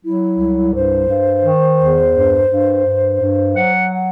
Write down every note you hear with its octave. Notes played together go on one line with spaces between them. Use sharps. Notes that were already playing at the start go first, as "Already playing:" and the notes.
F#3 E4
C2
G2 C5
G2
D#3
E2
G2
G2
G2
G2
F#3 F#5
F#5